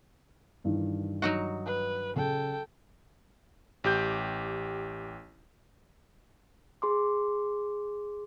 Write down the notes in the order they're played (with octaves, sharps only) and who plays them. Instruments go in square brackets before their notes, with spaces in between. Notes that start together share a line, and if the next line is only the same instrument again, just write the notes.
[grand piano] G2 D#3 E3
[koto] F#3 D#4 F#4
[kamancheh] B4
[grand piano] C#3 [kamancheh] A4 G5
[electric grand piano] A1 G4 G6
[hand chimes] G#4 C6 D6